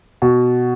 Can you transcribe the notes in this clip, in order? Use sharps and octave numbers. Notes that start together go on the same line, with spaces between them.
B2